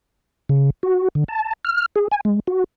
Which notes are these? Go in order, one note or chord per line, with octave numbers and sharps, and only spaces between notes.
C#3
F#4
D3
A5
F6
G#4
G#5
G#3
F#4